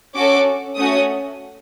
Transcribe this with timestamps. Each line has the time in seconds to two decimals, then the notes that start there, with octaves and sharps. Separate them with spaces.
0.14 C#4 F#4 A4 D6
0.76 A3 C#4 F#4 D#6